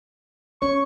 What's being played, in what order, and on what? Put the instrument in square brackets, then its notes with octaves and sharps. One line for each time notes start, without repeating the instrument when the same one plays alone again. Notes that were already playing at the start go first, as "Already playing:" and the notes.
[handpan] C#4 C#5 [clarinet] C#6